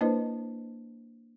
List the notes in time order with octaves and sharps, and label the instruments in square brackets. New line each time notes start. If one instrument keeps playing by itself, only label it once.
[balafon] A#3 D4 E4 B4 C5 D#5